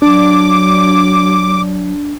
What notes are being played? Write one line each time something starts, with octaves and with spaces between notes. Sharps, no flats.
F#3 D4 D6